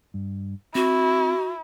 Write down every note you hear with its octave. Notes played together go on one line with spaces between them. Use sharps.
G2
C4 E4 F#4